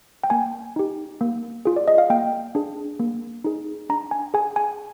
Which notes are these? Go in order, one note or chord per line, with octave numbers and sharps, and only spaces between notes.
G5
A#3 G#5
D#4 G4
A#3
F4 G#4
D5
D#5
F5
A#3 G5
D4 G#4
A#3
D#4 G#4
D4 A#5
G#5
G#4 G#5
G#5